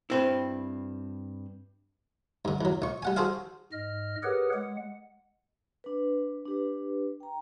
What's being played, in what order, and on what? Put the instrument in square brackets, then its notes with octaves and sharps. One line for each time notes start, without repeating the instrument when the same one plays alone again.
[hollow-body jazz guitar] G2 C4 E4
[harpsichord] G2 D3
E2 F#3
A#1 C#6
G3 F#5 G#5
F#4 G#4 A4 C5 F5
[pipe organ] G#2 D#5 F6
G4 G#4 A#4 B4 C#5 F#5
G#3 F#5
[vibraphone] D4 B4
D4 G4 B4
G5 A#5